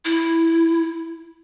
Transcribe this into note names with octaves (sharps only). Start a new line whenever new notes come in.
E4